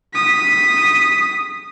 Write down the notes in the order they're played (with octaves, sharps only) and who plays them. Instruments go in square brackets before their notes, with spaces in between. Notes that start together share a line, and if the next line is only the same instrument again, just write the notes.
[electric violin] D#6 B6